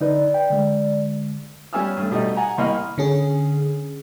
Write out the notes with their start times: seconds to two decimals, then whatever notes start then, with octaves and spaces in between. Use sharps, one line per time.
0.01 D3 D#4 B4 D5
0.34 G5
0.50 D3 G#3
1.73 G3 B3 C#4 G#5 E6 F6
1.97 G2 A3
2.11 B2 G3 A3 D#4
2.37 F#5 G#5 A#5
2.58 C2 A#3 D#5 B5 F6
2.98 D3 C#4 G#4